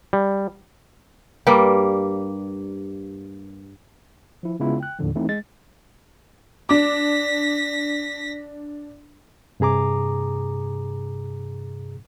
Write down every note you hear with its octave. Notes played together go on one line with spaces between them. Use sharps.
G3
G2 G3 A#3
F3 E4
C#3 G#3 B3 E4 F4
G5 F#6
D#2 A2 D3 F3
E3 A3 C4 D#4 E4
G#3 A6
D4 D6 A#6 B6
G2 C3 G#4 A#5 D6